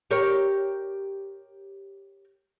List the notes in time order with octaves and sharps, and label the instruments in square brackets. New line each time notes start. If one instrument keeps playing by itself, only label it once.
[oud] G4 A#4 C#5